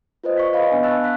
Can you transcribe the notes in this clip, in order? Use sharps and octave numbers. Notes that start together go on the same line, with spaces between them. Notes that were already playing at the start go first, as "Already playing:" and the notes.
F4 B4 C5 D#5
D5 C#6 B6
B4 D#5 F5 B5
B3 D4 F5 G#5
A5 B5 C#6 E6 F#6 A6
F5 F#6 B6